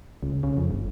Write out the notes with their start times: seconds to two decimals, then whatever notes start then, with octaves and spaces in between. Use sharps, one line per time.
0.23 C#2
0.43 C#3
0.57 F2
0.71 G1